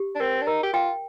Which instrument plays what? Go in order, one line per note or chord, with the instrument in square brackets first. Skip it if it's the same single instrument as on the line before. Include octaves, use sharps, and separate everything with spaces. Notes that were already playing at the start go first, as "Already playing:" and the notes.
Already playing: [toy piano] G4
[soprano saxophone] D4
[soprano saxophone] C4 [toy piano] A#4
[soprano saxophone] D4
[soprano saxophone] D#4 [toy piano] A#4
[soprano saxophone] G4
[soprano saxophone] F4 [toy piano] G5